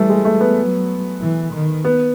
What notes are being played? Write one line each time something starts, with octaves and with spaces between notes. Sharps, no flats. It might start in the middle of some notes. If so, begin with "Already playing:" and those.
Already playing: E3 G3 A3
G#3
A3
B3
F#3
E3
D#3
B3